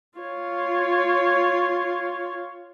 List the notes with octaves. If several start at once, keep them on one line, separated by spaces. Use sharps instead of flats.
F4 C#5